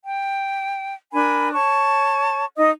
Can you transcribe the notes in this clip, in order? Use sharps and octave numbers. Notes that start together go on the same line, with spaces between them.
G5
D4 A#4 G#5 B5
C#5 A5 C#6
D#4 D#5 D#6